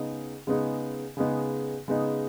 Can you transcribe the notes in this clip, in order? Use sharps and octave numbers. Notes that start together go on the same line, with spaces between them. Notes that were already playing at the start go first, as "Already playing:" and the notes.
Already playing: C#3 G#3 B3 D#4
C#3 G#3 B3 D#4
C#3 G#3 B3 D#4
C#3 G#3 B3 D#4